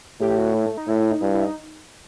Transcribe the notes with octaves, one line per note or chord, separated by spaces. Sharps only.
A2 G4
F#4
E4
A3
D#4
A2 E4
E4
D#4
G2 E4
E4
D#4